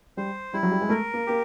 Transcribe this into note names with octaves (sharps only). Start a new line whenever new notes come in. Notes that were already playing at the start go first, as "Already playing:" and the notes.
G3 C5
G3 E4
F#3
G3
G#3
A3 A#4
A#3
A#3 G4